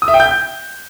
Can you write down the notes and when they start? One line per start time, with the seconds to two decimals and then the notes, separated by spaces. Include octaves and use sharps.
0.02 D#6
0.08 E5
0.14 G5
0.20 G6